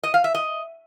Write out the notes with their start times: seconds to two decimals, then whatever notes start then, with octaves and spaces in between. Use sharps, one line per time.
0.03 D#5
0.14 F5
0.24 E5
0.35 D#5